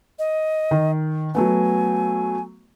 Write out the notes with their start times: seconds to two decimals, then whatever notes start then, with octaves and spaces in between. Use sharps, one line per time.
0.19 D#5
0.71 D#3
1.35 F#3 A3 B3 G#5